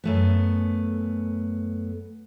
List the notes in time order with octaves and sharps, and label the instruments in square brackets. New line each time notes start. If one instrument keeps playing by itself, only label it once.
[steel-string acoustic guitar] F#2 A3 B3